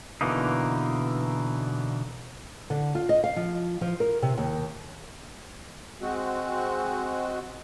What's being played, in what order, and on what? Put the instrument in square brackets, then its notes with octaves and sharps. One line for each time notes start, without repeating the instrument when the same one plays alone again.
[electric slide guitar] B2 D3 E3 A#3 D#4
[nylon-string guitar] D3
F4
D#5
F5
F3
F3
A#4
C3
D#2
[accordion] G#3 C4 F#4